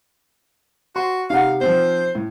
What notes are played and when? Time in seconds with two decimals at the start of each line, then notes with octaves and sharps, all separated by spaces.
0.96 F#4 C6
1.30 C3 D#4 F5 F#5
1.61 F3 C4 C5
2.15 A2